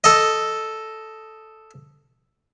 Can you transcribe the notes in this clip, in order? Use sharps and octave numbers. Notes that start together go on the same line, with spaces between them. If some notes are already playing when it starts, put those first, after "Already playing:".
A4 D#5